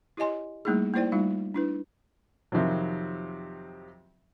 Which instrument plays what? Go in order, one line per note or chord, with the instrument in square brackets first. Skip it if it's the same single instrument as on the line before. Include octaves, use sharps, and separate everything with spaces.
[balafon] E4 G4 C#5 D#5 G#5 C6
G3 A3 A#3 D#4 E4 G#4
A#3 D#4 E4 C5 D5 G5
G3 A3 D#4 F4 F5
D4 E4 B4
[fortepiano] F2 C3 D#3 F3 F#3